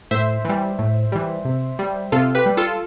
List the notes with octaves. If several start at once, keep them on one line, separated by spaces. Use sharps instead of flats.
A2 C5 E5
E3 G3
A2
E3 G3
C3
G3
C3 F4 A4
G4 B4
G3
F4 A4